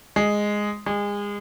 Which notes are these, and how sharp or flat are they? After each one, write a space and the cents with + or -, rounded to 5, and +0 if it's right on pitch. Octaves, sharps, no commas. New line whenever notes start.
G#3 -5
G#3 -30